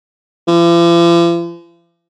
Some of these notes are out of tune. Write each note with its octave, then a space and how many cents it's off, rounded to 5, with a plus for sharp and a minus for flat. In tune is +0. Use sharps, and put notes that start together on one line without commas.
F3 -45